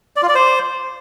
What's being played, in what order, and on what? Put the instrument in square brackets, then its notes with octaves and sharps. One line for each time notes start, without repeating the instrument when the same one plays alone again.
[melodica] D5
F4
D5
C5